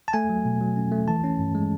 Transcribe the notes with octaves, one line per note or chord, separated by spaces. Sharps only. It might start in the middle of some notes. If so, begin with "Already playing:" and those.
A5
A3 G#5
F#3
B2
F#3
C#4
A3
E3 A5
C#4
G2
G#3